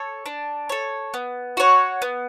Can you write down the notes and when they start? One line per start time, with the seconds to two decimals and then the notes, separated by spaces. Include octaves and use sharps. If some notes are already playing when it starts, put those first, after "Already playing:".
Already playing: A4 C#5
0.26 D4
0.69 A4 C#5
1.14 B3
1.57 F#4 C#5 F#5
2.02 B3